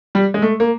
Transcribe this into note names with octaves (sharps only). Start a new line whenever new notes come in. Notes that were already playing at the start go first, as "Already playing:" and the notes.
G3
G#3
A3
A#3